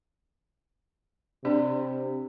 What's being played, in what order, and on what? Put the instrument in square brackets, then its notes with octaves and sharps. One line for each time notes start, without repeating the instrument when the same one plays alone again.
[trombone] C3 [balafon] D4 G4 D5